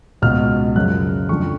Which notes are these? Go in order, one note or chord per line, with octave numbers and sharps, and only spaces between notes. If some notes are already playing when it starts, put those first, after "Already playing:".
C#2 B2 F6
F#2 C#3 F3 F#6
F2 D3 F3 C#6